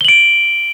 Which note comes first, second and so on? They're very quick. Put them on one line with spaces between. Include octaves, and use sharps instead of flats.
G7 F#7 D7